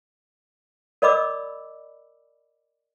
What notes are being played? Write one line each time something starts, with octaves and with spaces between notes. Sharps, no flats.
A#4 D5 D#5 B5 D6 E6